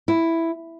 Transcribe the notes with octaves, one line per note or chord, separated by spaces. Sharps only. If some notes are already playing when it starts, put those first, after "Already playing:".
E4